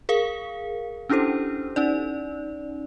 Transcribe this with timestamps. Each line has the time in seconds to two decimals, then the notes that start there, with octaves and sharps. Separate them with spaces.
0.09 G#4 A#4 F5
1.09 C#4 D4 E4 G4 A4 C5
1.76 C#4 D#4 D5